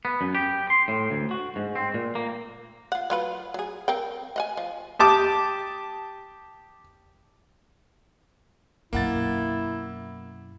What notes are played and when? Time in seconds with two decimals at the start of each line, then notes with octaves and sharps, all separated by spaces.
0.05 B3
0.21 F#2
0.35 G4
0.70 C6
0.88 A2
1.11 D2
1.31 F#4
1.56 G#2
1.75 C4
1.94 A#2
2.15 A#3
2.92 F4 F#5
3.10 F#3 F4 B4
3.54 F#3 G#4
3.88 C4 A#4 G5
4.36 D#5 F#5 G#5
4.57 F3
4.99 G4 A5 D6 D#6
8.93 F#2 B2 A#3 E4 F#5 A6